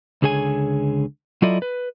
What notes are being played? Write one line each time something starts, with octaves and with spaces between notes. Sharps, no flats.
C#2 D3 G#4 C#5 G#5
F#3 E4 F4 A4 D5 D#5
B4